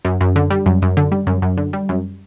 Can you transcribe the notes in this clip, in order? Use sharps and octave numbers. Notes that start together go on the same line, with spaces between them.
F#2
F#2
D3
G3
F#2
F#2
D3
G3
F#2
F#2
D3
G3
F#2